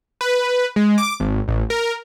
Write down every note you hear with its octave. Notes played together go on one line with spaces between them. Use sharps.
B4
G#3
D6
G#1
A1
A#4